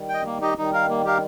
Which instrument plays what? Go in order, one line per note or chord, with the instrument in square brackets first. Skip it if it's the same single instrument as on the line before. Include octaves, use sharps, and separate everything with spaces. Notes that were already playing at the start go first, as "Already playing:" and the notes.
Already playing: [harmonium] D#3 G3
[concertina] D#5 G5
A#3
D#4 G4 D#5
[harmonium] D#3 G3 [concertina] D#4
[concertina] A#4 F5
A#3
G4 A#4 F5